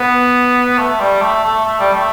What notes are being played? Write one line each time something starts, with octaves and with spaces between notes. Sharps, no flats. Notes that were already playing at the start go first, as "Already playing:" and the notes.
Already playing: B3
A3
G3
A3
A3
A3
G3
A3